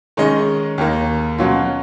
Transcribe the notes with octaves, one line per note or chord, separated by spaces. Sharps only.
D#3 G#3 C#4 G#4 D#5
D#2 D#3 A#3
B2 F#3 C#4 F4